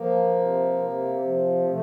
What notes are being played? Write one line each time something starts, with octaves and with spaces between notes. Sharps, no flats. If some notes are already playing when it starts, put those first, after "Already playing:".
Already playing: F3 A#3
C3
C3
F3
F3 A3